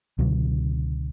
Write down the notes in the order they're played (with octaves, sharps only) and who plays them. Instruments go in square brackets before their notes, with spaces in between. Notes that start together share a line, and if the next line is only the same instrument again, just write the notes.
[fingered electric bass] C#2 B2 D3 F#3